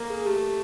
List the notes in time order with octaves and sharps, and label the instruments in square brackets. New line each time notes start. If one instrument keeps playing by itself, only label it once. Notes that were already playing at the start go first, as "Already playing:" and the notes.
Already playing: [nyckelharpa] A#3
[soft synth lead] G#4
[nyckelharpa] A3 [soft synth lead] G4